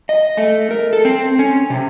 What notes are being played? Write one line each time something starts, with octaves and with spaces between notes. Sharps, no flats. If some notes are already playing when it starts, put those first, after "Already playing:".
D#5
A3
A#4
A4
C4
C#4
C3